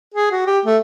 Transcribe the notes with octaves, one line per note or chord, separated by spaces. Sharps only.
G#4
F#4
G4
A3